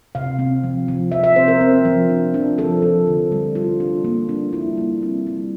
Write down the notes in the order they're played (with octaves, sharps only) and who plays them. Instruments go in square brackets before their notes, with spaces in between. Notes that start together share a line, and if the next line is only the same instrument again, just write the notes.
[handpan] C3 F5
C4
F3
F3
F3 E5
E5
C4 C5
A#4
C4
F3
D4
D4
F3 A4
F3
D3
G3
G3 F4
D4
A#3
D4
G3 E4
A#3
C4
G3